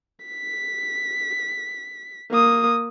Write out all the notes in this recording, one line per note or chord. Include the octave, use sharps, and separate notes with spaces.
B6
A#3 D#6